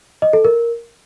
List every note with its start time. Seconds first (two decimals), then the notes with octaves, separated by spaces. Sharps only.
0.22 D#5
0.33 A4
0.45 A#4